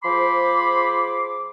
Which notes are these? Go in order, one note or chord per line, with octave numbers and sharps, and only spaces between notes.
F3 G#4 C5 B5 C6 D6